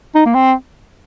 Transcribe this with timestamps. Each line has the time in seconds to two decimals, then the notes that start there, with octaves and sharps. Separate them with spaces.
0.15 D#4
0.26 A#3
0.35 C4